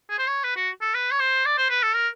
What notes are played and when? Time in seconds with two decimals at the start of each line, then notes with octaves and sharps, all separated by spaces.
0.10 G#4
0.19 C5
0.27 C#5
0.44 B4
0.56 F#4
0.82 A4
0.95 B4
1.12 C#5
1.20 C5
1.45 D5
1.58 C5
1.70 B4
1.83 A4
1.95 A#4